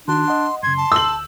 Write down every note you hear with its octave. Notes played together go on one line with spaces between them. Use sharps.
D#3 D4 F#4 C6
D#5 F#5
F#2 C#3 C6 G#6
A5
D2 E6 G6 F#7